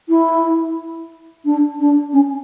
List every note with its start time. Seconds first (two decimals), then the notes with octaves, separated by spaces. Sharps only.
0.09 E4
1.45 D4
1.79 D4
2.13 C#4